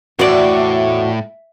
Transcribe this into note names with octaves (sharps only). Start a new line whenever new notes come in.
E2 A2 F#4 C5 D5 E5